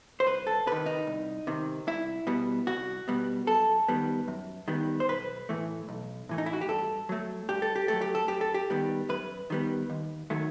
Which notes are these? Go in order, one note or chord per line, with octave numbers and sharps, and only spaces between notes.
C5
C2 B4
A4
C3 D#3 B4
D#4
C2
C3 D#3
C2 E4
B2 G3 B3
C2 F#4
B2 G3 B3
F#2 A4
D#3 G3 B3
F#2
D#3 G3 B3
C5
B1 B4
A2 E3 A3
B1
A2 E3 A3
D#4
E4
F#4
G4
G2 A4
F#3 A3
G2 G4
A4
G4
F#3 A3 A4
G4
A4
F#2 G4
A4
G4
D#3 G3 B3
F#2 B4
D#3 G3 B3
D#2
D#3 F#3 A3